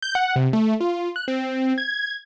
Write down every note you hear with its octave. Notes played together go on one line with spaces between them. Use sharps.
G6
F#5
C3
A3
F4
F#6
C4
G#6